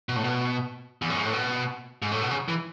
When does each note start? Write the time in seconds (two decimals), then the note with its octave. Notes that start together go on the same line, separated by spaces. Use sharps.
0.09 B2
0.16 A2
0.24 B2
1.02 E2
1.10 F#2
1.17 G#2
1.25 A2
1.33 B2
2.02 G#2
2.12 A2
2.22 B2
2.31 C#3
2.48 E3